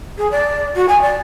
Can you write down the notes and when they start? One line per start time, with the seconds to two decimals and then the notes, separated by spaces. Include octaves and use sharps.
0.18 G#4
0.31 D5
0.76 F#4
0.89 G#5
1.02 D5